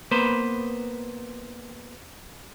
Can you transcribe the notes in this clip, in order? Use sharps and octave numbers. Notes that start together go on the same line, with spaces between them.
A#3 B3 B4 C5